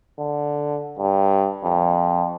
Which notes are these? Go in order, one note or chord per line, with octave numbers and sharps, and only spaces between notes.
D3
G2
F2